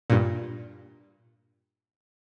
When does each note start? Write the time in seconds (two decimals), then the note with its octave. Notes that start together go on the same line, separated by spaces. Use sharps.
0.10 G2 A#2